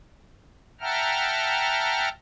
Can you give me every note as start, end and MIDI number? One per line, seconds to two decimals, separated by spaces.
0.81 2.09 76
0.81 2.09 78
0.81 2.09 79
0.81 2.09 81
0.81 2.09 82
0.81 2.09 89